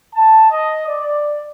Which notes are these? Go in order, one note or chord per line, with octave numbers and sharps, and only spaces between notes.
A5
D#5
D5